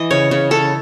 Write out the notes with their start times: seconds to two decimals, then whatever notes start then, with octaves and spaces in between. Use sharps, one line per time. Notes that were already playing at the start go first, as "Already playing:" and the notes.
Already playing: E3 D#5
0.11 C#3 C#5
0.31 C#3
0.51 C#3 A4